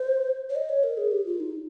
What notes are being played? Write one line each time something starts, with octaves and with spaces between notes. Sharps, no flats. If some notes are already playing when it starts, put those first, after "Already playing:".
Already playing: C5
C#5
D#5
C#5
A#4
G#4
G4
F4
D#4